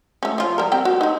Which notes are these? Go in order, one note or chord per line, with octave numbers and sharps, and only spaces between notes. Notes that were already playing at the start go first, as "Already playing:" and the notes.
A3 C#4
F3 F4
G3 A#4
C4 G4 G5
F#4
C4 D#4